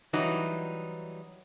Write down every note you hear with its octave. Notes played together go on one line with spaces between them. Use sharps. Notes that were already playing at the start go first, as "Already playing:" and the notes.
E3 F#3 G3 D#4